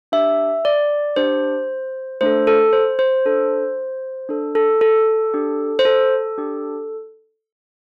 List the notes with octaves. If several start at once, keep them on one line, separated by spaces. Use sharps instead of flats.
D4 G4 E5
D5
D4 G4 C5
A3 D4 A4 C5
A4
C5
C5
D4 A4
D4 A4
A4
A4
D4 G4
C5
A4
D4 G4